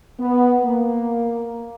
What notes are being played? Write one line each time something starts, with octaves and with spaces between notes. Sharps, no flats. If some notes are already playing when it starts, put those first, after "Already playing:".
B3
A#3